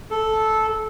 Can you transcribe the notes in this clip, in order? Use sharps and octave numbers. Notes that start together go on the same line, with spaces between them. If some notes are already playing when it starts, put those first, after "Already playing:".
A4